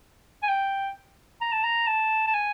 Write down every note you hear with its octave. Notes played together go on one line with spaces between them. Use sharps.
G#5
G5
A#5
A5
A#5
A5
A5
G#5